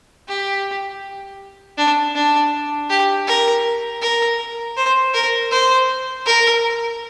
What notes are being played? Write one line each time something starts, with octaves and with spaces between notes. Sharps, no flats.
G4
D4
D4
G4
A#4
A#4
C5
A#4
C5
A#4